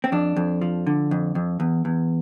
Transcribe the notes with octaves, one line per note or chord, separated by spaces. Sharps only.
C4
F2 D4
F2
F3
D3
F2
F2
E2
E2